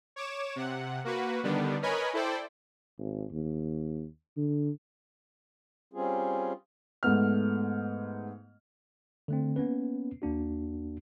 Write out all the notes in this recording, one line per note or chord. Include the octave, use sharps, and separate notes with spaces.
C#5 D6 E7
C3 F#5
A#3 F#4 B4
D3 D#3 G3 B3 D4
A#4 B4 C#5 D#5 G#5 B5
E4 A4 C5 D5 G5
G#1
D#2
D3
G3 C4 C#4 F4 G#4
G#2 A3 B3 F6
D3 A3 C4
A#3 B3 C#4 B4
D#2 A#3 D4 F#4